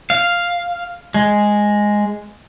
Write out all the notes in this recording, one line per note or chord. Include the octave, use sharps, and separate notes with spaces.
F5
G#3